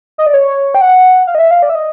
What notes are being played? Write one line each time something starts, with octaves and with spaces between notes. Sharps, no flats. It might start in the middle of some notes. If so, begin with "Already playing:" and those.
D#5
D5
C#5
G5
F#5
F5
D#5
E5
F5
D5
E5
D#5